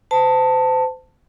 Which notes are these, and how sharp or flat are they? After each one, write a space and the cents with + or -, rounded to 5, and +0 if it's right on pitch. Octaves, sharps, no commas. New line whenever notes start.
C5 -40 A5 +15